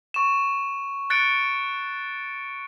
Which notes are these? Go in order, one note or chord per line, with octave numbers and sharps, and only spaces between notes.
C#6 E7
F#6 A6 C#7 D7